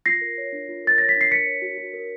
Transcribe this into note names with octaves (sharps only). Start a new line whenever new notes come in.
F4 A#6 C7
A#4
C#5
D4
F4
A#4 A6
C#5 A#6
B6
D4
C7
A#4 B6 C#7
C#5
F#4
F#4
A#4